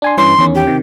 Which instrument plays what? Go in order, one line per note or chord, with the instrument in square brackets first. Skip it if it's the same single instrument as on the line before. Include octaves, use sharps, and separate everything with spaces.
[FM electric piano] D4 G#5 C6
[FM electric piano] G2 E3 C#4 [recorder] C6
[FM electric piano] E2 D#3 C#4
[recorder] G4
[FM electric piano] C3 D#3